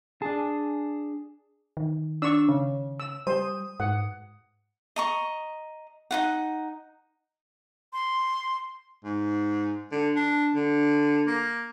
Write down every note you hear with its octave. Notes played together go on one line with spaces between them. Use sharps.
D4 G#4 A5
D#3
D4 C#6 E6
C#3
E6
G3 C5 D#6
G#2 F#5
D#5 A#5 C#6
D#4 F4 F#5
C6
G#2
D3
D4
D3
A#3